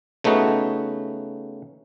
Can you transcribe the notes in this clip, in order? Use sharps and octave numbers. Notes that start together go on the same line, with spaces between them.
C#3 A3 B3 D#4 F#4